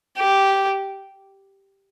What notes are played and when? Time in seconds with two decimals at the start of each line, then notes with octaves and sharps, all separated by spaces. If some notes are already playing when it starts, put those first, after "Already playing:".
0.18 G4